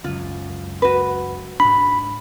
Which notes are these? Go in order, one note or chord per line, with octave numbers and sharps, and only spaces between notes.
C#2 F#2 F4
F#4 B4
G#2 D4 B5